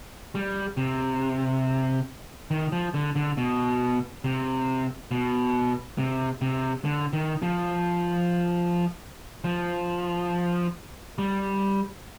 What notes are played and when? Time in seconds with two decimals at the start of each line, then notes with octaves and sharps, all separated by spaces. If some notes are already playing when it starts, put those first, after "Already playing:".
0.35 G3
0.77 C3
2.51 D#3
2.72 F3
2.94 D3
3.15 D3
3.37 B2
4.24 C3
5.11 B2
5.98 C3
6.42 C3
6.85 D3
7.13 D#3
7.42 F3
9.44 F3
11.18 G3